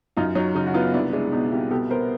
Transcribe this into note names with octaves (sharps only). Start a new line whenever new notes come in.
F#2 D#4 F4
F#3 D#4
C#3 D#4
F#4
B3 D#4 F4
C2 D4 E4
G#3 D4 E4
B2 D#4
C2 F4 G4
B2 G4 A4
B3 A#4 C5